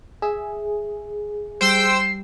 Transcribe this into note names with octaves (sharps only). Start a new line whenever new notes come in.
G#4 E5
G3 C5 G5 E6 C7